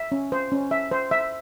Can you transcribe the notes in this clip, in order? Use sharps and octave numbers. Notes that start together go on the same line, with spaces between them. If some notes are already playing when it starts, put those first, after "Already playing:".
Already playing: E5
C#4
C5
C#4
E5
C5
E5